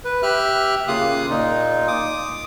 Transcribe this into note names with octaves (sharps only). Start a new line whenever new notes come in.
B4
G4 E5 F6 F#6
C#3 A#3 F4 F5 D#6 F#6
A#2 D#4 F4
D6 D#6